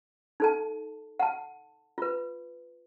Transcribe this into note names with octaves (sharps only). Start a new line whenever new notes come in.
D#4 A4 A5
F#5 A5
F4 B4